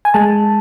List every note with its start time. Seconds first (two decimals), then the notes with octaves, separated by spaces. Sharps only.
0.05 G#5
0.14 G#3 A5